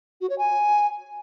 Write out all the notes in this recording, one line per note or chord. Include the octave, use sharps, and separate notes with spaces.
F#4
C#5
G#5